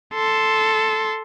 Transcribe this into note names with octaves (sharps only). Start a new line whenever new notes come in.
A4 C6